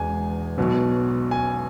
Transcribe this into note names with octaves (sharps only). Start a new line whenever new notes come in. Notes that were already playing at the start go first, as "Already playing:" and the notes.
Already playing: E1 E2 G#3 G#5
B1 B2 F#3
G#5